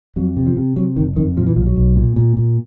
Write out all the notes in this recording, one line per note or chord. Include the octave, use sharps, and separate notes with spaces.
F2 F#3
C3
F3
C3
C3 F#3
F#1 D#3
F2 D#3
A#2 F3
E3
B1 F3
F#3
B1
A#2
A#2
A#2